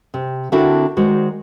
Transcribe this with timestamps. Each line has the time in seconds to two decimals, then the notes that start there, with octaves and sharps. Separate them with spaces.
0.14 C3
0.52 D3 C4 D4 E4 F#4 A#4
0.97 D#3 G#3 F#4 C5 D5